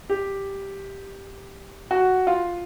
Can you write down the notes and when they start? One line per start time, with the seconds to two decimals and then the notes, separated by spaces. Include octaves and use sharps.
0.10 G4
1.91 F#4
2.27 F4